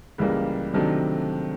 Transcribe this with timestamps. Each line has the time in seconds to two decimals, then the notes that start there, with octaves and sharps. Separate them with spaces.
0.18 C#2 C#3 E3 G3 A#3
0.73 C3 D#3 F#3 A3 D4